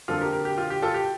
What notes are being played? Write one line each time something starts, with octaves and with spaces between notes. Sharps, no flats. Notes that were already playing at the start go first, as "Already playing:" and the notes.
F2 D3 F3 A#3 F4 A4
G4 A#4
G4 A#4
G4
F4
G4
F4 A4
G4